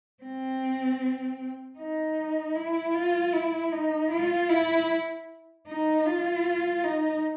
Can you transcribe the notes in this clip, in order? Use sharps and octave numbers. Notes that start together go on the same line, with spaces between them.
C4
D#4
E4
F4
E4
D#4
F4
E4
D#4
F4
D#4